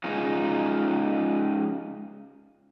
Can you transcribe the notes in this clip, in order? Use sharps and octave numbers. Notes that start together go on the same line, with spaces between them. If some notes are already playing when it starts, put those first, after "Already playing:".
G#3 C#4 D#4 F4